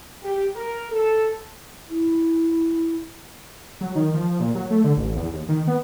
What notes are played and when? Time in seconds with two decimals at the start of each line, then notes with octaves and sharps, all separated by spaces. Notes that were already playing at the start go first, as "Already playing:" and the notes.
0.23 G4
0.55 A#4
0.91 A4
1.89 E4
3.81 F#3
3.95 D#3
4.14 F3
4.40 A#2
4.55 F#3
4.71 A3
4.84 D3
4.97 A1
5.16 E2
5.33 D#2
5.49 D#3
5.67 B3